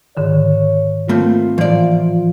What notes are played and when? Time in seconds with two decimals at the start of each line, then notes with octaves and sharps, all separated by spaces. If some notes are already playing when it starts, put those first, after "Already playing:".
0.17 G#2 D3 D#3 C#5
1.09 A3 A#3 C4 F4
1.58 A2 E3 F3 D5